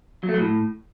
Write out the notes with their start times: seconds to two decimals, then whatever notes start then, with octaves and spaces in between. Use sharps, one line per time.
0.23 F#3
0.29 A3
0.34 F#3
0.39 A2